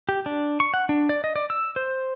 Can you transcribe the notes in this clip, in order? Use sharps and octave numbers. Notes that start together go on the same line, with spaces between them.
G4
D4
C#6
F#5
D4
D5
D#5
D5
E6
C5